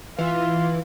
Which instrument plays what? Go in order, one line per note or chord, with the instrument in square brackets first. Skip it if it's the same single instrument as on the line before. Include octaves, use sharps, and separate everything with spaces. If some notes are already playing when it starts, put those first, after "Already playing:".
[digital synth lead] E3 [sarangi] F4